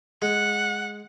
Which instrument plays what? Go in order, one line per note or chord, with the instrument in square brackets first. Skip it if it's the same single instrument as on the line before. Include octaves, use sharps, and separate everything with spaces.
[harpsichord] G#3 [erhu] F#5